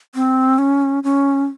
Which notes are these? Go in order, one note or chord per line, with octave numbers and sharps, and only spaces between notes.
C4
C#4
C#4